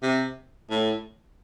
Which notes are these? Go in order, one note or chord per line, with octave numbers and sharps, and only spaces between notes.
C3
A2